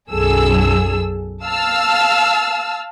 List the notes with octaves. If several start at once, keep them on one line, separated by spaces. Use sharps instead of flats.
B1 F#2 G#4 A4 E6
F5 A5 E6 F6